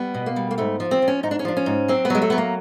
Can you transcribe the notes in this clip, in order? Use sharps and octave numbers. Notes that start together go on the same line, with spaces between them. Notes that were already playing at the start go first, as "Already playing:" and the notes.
Already playing: G3 B3
B2
A#3
G3
A#3
G#2 A3
F3
C4
F3
C#4
G#2 D#4
D4
C#4
F3 D4
C#4
G#2
F#3 C4
B3
F#3 G#3
A3
F#3 B3
A#3